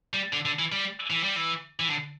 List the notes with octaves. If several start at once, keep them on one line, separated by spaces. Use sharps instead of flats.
G3
D3
D3
E3
G3
E3
G3
E3
E3
D3